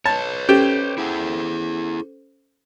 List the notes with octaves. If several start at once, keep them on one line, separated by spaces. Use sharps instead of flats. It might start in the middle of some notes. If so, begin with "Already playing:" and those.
B4 C#5 A5
C#4 G4 A4 C5
E4 G#4